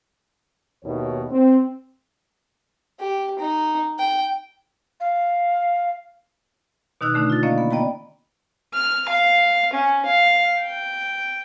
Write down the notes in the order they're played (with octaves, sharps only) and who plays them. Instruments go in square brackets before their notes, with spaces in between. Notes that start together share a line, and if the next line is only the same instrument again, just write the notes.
[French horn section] D#2 B2 D#3 E4 C#5
C4
[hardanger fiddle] G4
D#4
G5
[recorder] F5
[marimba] B2 D#3 D#4 E6 F#6
D3 A3 D4 D#4
F4 A6
A#3 C#4 D5 D#5 F5
B3
D5 D#5 G5 A#5 B5
[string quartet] F6
F5
C#4
F5
G5